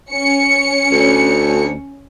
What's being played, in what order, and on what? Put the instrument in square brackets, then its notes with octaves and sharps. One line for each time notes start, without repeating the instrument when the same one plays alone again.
[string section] C#4 C#7
[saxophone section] D2